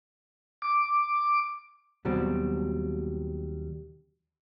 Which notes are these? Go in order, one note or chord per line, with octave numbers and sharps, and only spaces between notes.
D6
D#2 B2 F#3 G3 C4